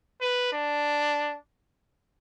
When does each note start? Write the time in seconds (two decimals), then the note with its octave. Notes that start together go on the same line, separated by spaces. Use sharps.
0.21 B4
0.53 D4